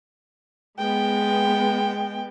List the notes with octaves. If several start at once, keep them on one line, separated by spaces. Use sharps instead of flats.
G#3 B3 G5